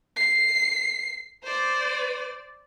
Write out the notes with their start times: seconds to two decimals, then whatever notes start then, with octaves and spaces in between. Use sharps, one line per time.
0.17 C7
1.44 C5 D5